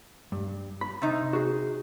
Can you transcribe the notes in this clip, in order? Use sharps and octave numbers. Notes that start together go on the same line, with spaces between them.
G2
B5
C3 D#4
F#4 G#4